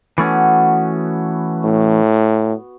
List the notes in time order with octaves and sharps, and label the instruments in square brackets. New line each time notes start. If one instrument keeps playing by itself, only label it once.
[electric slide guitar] E3 A3 C#4 [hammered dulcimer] B3 F#4
[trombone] A2